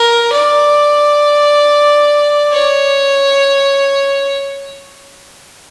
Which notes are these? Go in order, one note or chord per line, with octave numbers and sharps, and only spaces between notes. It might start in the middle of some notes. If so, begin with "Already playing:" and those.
Already playing: A#4
D5
C#5